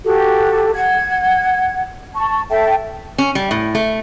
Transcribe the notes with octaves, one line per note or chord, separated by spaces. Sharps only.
F#4 G4 A4
F#5 G#6
A5 C#6
A4 E5 G5 A5
C#4
G3
A2
A3